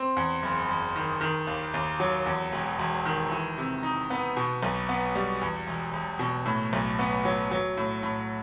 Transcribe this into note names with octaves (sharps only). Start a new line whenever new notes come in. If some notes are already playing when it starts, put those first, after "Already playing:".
Already playing: C4
E2
F#1
F#1
D#3
D#3
D#2
D#2
F#3
E2
E1
E1
D#3
E3
C3
D#4
B3
B2
B1
B3
G3
E2
E1
E1
B2
A2
B1
B3
F#3
F#3
A2
A2